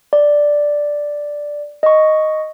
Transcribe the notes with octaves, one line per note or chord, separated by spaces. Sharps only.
D5
D#5 C#6